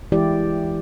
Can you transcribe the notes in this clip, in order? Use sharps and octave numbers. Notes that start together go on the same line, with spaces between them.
E3 G#3 E4 G4 D5